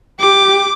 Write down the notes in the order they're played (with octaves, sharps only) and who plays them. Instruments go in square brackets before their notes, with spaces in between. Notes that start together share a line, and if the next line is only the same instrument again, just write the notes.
[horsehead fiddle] G4 [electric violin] D6